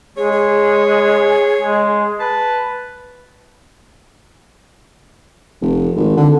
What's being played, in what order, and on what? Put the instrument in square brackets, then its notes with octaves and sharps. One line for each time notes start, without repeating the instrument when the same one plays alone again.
[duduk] G#3 [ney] G#4 [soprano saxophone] C#5
[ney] G#4
[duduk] G#3
[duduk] B4 [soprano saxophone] A5
[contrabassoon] F1
G#1
D3